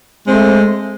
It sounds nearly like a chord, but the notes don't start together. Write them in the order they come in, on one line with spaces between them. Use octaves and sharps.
G#3 C4 A3